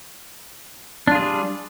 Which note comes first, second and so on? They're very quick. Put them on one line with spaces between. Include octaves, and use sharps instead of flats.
D4 F4 G#4 G3